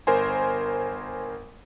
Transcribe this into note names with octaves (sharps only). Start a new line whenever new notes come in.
G1 A#4 C5 G#5 C6